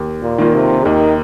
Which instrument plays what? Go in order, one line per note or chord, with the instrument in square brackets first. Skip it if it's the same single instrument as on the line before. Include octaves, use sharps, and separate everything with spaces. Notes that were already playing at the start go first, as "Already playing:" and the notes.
Already playing: [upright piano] D#2
[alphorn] A#2
[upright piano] D#3 A#3 F4
[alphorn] C3
[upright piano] D#2 [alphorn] D#3